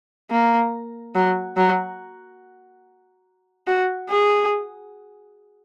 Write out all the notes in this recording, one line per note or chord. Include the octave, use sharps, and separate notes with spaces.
A#3
F#3
F#3
F#4
G#4